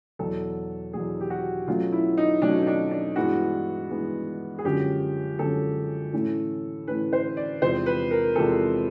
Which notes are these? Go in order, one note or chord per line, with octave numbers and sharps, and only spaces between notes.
E2 B2 F#3 A4
E2 B2 F#3 G#4
G4
F#4
B2 F#3 A3 C#4 F4
E4
D#4
B2 F#3 A3 C#4 D4
D#4
D4
D4
G2 E3 G#3 B3 F#4
G2 E3 G#3 B3
G#4
F#2 D3 F3 G#3 C#4 G4
F#2 D3 F3 G#3 C#4 A4
A2 E3 A3 C#4
A2 E3 A3 C#4 B4
C5
D5
E2 C3 F3 G#3 C4 C5
B4
A#4
E2 C3 F3 G#3 C4 A4